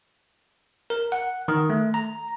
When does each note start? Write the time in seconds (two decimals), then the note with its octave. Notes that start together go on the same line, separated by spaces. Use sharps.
0.90 A#4
1.12 F#5
1.48 D#3
1.70 A3
1.94 A#5